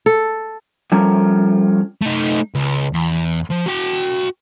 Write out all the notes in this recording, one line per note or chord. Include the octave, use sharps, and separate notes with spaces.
A4
F3 G3 A3 C#4 A4 A#4
A3 D#4
C#2
E2
F3
F#4 G5